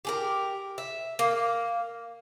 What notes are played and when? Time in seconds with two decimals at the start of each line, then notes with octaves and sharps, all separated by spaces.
0.05 G4 G#4 A#4
0.78 E5
1.19 A#3